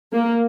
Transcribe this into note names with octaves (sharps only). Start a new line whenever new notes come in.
A#3